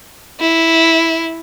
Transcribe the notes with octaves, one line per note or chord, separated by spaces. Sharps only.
E4